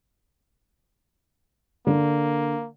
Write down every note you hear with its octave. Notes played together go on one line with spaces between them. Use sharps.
D3 A#3